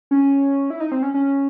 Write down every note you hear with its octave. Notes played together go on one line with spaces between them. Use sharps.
C#4
E4
D#4
C4
C#4
C#4